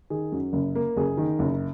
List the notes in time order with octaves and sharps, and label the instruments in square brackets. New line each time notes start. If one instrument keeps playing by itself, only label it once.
[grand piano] D#3 G#4
F#2
F#1
A#3
F#1 G#4
D#3
F#1